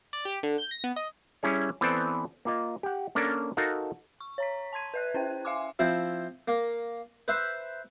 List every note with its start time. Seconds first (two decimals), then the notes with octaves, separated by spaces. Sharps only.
0.13 D5
0.25 G4
0.43 D3
0.58 G6
0.71 A#6
0.84 B3
0.96 D#5
1.43 G3 C#4 E4 G#4 C#5
1.81 E3 B3 C4 A4 C5 D5
2.45 A#3 F4 D#5
2.83 G4 F#5
3.15 A#3 C#4 D4 A4 A#4 D5
3.57 D#4 F#4 A4 A#4 F5
4.20 C#6
4.38 C#5 A#5 B6
4.73 A5 C6 G#6 D#7
4.94 B4 E5 F#6
5.14 C#4 E4 C5 G5
5.45 E5 F5 G#5 C6 D6
5.79 F3 C4 E4
6.48 A#3
7.28 B4 C5 E5